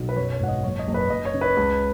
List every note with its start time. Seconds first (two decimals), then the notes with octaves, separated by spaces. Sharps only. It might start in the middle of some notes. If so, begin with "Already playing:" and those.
Already playing: B1 B2
0.09 B4
0.16 F#2 C#5
0.32 C#5
0.40 G#1 F#5
0.48 D#5
0.64 F#1 C#5
0.79 D#5
0.87 F#1
0.94 B4
1.10 F#1 D#5
1.25 C#5
1.34 C#3
1.41 B4
1.56 C#2